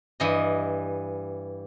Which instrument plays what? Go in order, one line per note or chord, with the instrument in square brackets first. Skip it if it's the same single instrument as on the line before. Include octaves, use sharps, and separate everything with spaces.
[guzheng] G2 E3 D#5